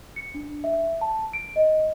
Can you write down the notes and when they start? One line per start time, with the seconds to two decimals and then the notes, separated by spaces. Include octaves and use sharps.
0.16 C#7
0.35 D4
0.64 E5
1.01 A5
1.33 D7
1.56 D#5